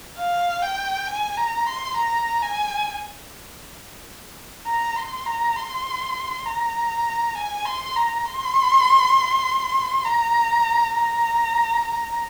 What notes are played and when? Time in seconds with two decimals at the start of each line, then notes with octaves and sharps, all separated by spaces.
0.18 F5
0.62 G5
1.07 G#5
1.37 A#5
1.66 C6
1.97 A#5
2.42 G#5
4.66 A#5
4.96 C6
5.26 A#5
5.56 C6
6.46 A#5
7.35 G#5
7.65 C6
7.96 A#5
8.25 C6
10.05 A#5
10.94 A#5
11.85 A#5